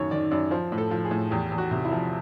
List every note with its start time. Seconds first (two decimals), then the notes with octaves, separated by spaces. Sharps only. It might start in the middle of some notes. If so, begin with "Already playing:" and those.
Already playing: F#2 A2 D#3 C#5
0.11 D#3 D5
0.31 F#2 D5
0.51 F3 C5
0.72 A2
0.78 A4
0.91 F3
1.05 G#4
1.11 A2
1.31 E2 G4
1.52 E2
1.58 F#4
1.71 C3
1.85 E4
1.92 F3